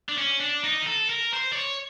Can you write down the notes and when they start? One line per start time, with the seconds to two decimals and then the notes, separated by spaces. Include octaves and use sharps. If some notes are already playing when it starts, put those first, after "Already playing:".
0.09 D4
0.18 C#4
0.40 D4
0.64 D#4
0.82 A#4
0.87 A4
1.09 A#4
1.33 C5
1.52 D5
1.56 C#5